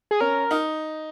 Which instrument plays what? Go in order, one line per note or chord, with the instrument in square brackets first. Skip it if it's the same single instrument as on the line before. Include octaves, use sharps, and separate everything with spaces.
[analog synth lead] G#4
[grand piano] C#4 [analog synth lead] A#4
[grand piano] D#4